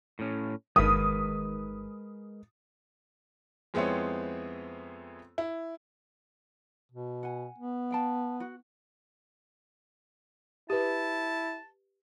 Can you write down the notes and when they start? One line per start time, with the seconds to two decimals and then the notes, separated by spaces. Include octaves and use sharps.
0.19 A2 C#4
0.76 G1 D#3 G#3 A#4 B4 D#6
3.74 F2 G#3 B3 C4 E4 C#5
5.38 E4
6.92 B2
7.23 F#5 G#5
7.58 B3
7.91 F5 G5 A5
8.40 F#4
10.70 E4 G4 B4 A5